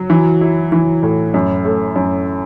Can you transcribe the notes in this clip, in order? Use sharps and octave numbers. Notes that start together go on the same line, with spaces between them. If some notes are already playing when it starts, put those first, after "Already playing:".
Already playing: F#3
E3
E4
E3
A2
F#2
A3
F#2